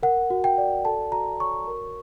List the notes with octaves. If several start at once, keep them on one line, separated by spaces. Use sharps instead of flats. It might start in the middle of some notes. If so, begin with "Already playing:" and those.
A#4 F#5
F#4
G5
D5
A4 A5
F#4 A#5
C#5 C#6
A#4